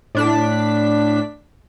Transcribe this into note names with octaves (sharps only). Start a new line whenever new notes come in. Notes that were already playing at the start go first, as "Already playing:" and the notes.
A2 D4 B6